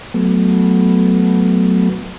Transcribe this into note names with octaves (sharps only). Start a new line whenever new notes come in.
F#3 A3 B3